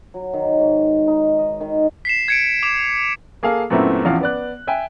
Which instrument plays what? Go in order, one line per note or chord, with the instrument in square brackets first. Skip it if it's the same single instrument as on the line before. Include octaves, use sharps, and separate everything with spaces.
[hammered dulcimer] F#3
D#3
G#2
D#4
D#5
D#3
[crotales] B6 C7 E7
G#6 C#7 D7
D6 E7
[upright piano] A#3 G#4 A4 F5
F#2 A#2 A3 B3 C4 E4
A1 E2 F3 F5 F#5
B3 D5 F#6
E5 G5 G#5